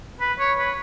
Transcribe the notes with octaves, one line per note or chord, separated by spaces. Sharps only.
B4
C#5
B4